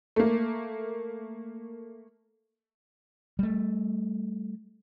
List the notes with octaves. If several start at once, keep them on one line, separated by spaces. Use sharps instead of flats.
A3 A#3
G3 A3